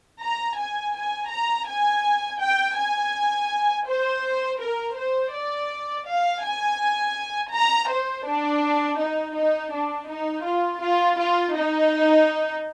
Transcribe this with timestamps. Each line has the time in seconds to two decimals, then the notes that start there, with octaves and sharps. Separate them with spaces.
0.21 A#5
0.58 G#5
0.95 G#5
1.31 A#5
1.67 G#5
2.41 G5
2.77 G#5
3.87 C5
4.61 A#4
4.97 C5
5.33 D5
6.07 F5
6.43 G#5
7.52 A#5
7.89 C5
8.26 D4
8.99 D#4
9.35 D#4
9.72 D4
10.09 D#4
10.45 F4
10.82 F4
11.19 F4
11.54 D#4